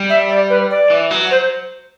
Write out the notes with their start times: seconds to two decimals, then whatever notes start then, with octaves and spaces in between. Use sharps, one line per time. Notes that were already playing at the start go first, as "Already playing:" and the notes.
Already playing: G3
0.09 E5
0.29 D5
0.49 B4
0.70 D5
0.90 E3
1.11 F#3
1.30 C5